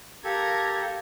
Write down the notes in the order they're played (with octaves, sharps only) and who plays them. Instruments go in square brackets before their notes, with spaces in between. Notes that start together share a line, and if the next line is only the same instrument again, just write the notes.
[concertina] G4 A4 [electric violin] A#4 G#6 [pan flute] F5